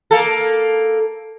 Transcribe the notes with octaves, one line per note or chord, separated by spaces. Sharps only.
A#3 A4